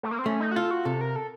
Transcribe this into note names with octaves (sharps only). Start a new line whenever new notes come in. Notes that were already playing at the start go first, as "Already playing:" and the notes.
A3
A#3
C4
A3 C#4
D#4
F#4
F4 A4
F#4
C3 A4
A#4
A4